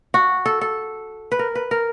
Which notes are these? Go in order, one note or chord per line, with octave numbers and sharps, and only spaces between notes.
F#4
A4
A4
B4
A#4
B4
A#4